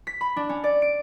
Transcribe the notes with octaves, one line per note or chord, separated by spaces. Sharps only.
B6
B5
D4
C#4
D5
D7